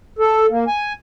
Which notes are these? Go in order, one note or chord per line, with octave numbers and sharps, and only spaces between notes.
A4
A#3
G#5